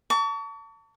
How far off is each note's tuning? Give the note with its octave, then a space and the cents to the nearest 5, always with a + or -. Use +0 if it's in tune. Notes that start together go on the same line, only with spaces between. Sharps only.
A5 +35 C#6 +40